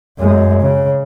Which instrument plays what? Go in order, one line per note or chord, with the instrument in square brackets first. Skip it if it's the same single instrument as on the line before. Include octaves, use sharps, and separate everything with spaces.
[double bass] F#2 G#3
C#3